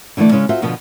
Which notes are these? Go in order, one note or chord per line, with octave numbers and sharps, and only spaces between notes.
D3 E3 G#3 A3 D5
C#3 G#3 C#4
F4 F#4 A4 C5 E5
B2 D3 F3 B3